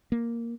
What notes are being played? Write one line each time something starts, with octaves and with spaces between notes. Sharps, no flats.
A#3